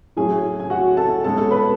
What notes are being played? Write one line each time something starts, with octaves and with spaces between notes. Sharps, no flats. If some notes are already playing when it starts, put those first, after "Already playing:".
A2 F#3 C#4 G#4 G#5
G#5
F#4 F#5
A4 A5
B2 G#3 C#4 A4 A5
A4 A5
B4 B5